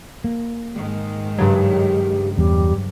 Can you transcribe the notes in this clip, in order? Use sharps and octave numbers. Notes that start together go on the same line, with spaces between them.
A#3
G#2 D#3 G#3
G2 C#3 F#3 G4
E2 G3